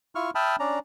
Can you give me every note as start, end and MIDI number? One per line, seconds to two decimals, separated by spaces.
0.15 0.30 64
0.15 0.30 65
0.15 0.30 85
0.15 0.30 89
0.35 0.56 76
0.35 0.56 79
0.35 0.56 81
0.35 0.56 83
0.35 0.56 87
0.35 0.56 89
0.60 0.79 61
0.60 0.79 62
0.60 0.79 74
0.60 0.79 82